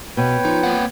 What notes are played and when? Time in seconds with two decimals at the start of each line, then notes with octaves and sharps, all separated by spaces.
0.17 B2 B4 C#5 G5
0.45 F3 D#4
0.63 A#3 C4 F#5